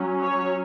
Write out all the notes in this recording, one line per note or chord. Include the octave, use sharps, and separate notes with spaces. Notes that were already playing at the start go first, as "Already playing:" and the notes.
Already playing: F#3 C#4
C#5